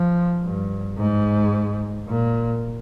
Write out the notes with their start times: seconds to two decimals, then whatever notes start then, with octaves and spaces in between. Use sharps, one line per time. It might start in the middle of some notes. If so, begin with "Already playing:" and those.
Already playing: F3
0.42 G2
0.98 G#2
2.08 A#2